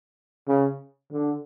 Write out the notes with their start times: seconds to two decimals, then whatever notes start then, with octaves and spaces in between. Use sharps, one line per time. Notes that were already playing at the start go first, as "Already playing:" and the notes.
0.47 C#3
1.11 D3